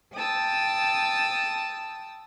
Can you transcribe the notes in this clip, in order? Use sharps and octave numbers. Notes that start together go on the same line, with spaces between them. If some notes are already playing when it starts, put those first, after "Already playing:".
G5 A5 D#6 E6